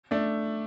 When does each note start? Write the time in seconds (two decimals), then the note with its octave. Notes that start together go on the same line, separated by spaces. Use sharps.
0.11 A3 D4